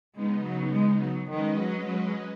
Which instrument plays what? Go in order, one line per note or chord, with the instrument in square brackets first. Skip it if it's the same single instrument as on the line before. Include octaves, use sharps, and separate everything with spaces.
[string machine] C#3 B3 D#4 [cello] G#3
[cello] F#3
G#3
F#3
[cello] D#3 [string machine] G#3 C#4 B4 D#5
[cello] F#3
F#3